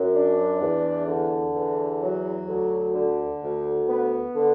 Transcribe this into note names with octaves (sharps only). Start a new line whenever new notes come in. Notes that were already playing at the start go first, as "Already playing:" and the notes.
Already playing: F#2
D4
E2
D3
E2
F#3
D2
D3
D2
B3
D3